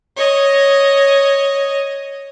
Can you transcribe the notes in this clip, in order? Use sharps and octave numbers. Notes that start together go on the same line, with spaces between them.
C#5 D#5